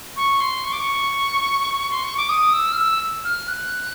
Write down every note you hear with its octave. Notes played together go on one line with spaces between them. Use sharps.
C#6
C6
C#6
D6
C#6
C6
C#6
D6
D#6
E6
F6
E6
F6
F#6